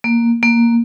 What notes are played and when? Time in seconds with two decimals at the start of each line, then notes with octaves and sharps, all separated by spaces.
0.04 A#3
0.43 A#3